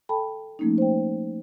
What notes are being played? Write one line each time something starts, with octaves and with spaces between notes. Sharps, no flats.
A4 G5 A5 B5
F3 A3 A#3 C#4 D#4
C5 G5